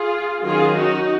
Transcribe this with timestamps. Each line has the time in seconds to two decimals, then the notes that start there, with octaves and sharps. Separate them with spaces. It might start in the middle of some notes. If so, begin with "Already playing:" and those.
Already playing: F4 G#4
0.43 D#3 F#3 C#4 F4 G#4
0.77 D#4 F#4